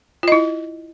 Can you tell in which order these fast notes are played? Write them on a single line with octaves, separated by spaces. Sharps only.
F4 D#5 E4